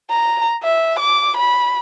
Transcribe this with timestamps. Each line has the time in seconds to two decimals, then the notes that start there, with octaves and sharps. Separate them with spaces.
0.11 A#5
0.63 E5
0.99 D6
1.37 B5